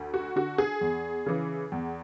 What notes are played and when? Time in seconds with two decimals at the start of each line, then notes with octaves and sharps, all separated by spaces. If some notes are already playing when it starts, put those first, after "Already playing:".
Already playing: D2
0.14 F#4
0.36 D3 F#4
0.58 G#4
0.81 E2
1.26 C#3 E3
1.72 E2